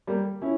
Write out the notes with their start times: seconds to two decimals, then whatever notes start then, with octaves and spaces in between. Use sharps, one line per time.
0.07 G3 A#3
0.42 C#4 E4